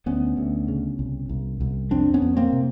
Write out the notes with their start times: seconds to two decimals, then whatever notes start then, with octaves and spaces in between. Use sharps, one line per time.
0.06 D2 B3 C#4
0.37 D2
0.68 C#3
0.99 C2
1.29 C2
1.60 C2
1.91 F2 C4 D4
2.14 B3 C#4
2.22 F2
2.37 A#3 C4
2.53 C3